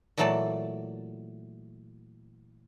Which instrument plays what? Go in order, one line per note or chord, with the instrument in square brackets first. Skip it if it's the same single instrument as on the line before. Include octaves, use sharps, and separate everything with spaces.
[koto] A#2 E3 F#3 A3 D5 A5